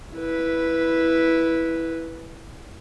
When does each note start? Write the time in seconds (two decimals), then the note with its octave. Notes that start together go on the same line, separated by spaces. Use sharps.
0.15 E4 B4